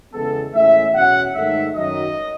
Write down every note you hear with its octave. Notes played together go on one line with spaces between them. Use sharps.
E2 C#3 E3 G#3 B3 A4
A2 E3 G#3 C#4 E5
E2 B2 F#3 C#4 F#5
G#2 D#3 A3 E5
F#2 D#3 F#3 D#5